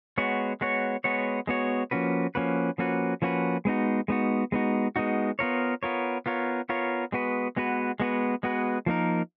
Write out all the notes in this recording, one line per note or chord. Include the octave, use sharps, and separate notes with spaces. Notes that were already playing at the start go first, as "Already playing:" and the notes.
G#3 B3 F#4 C#5
G#3 B3 F#4 C#5
G#3 B3 F#4 C#5
G#3 B3 F#4 C#5
F3 A#3 C#4 F#4 B4
F3 A#3 C#4 F#4 B4
F3 A#3 C#4 F#4 B4
F3 A#3 C#4 F#4 B4
G#3 B3 D#4 F#4
G#3 B3 D#4 F#4
G#3 B3 D#4 F#4
G#3 B3 D#4 F#4
B3 F4 A#4 C#5
B3 F4 A#4 C#5
B3 F4 A#4 C#5
B3 F4 A#4 C#5
G#3 B3 F#4 B4
G#3 B3 F#4 B4
G#3 B3 F#4 B4
G#3 B3 F#4 B4
F3 A#3 D#4 A#4